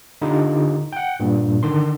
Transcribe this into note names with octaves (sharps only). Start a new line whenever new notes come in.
D3 D#4 F4 G4
F#5 G5
G2 A#2
D3 D#3 C6